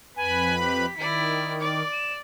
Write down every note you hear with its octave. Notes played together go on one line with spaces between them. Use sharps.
F2 B4 G#5 B5
G4 B6
D#3 E4 D5
D5 D6
E7